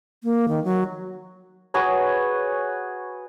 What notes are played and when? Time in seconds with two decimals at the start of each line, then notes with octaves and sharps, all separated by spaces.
0.24 A#3
0.48 D#3
0.64 F#3
1.74 F#4 G#4 B4 C#5